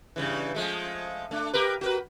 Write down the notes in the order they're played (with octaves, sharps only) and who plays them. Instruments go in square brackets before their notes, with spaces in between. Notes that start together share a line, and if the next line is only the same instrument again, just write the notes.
[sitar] G2 C#3 E3
F3 G#3 A3
A3 D4
G4 A#4 B4
F#4 A#4 B4